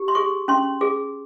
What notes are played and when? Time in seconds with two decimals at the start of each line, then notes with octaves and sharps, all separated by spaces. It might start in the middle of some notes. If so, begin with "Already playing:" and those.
Already playing: G4
0.08 C6
0.15 G#4 C#6
0.48 C#4 C6
0.81 G#4